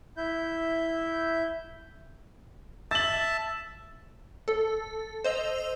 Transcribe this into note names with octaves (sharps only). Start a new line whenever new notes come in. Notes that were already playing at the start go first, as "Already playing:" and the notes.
E4 E5 G6
E5 A5 A6 F#7
A4
C5 D#5 E6 F7